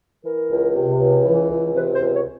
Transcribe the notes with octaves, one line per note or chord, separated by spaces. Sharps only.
E3 A#4
C#2
C3
C#2
E3
C#2
C3 B4
C5
C#2
C#5